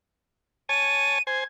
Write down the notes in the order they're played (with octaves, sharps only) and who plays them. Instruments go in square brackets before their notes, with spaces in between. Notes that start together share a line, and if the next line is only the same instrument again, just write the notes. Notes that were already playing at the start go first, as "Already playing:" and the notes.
[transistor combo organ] C#5 G#5 A5 [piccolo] D#7
[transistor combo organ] C5 G#5 [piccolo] G#6